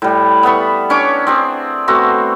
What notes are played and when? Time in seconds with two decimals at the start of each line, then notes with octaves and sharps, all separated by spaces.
0.02 A2 G3
0.43 B3 E5 B5 C#6
0.90 C#4 D4 C#5 D6
1.27 C4 D4 G#4
1.88 A3 B3 C4 F#4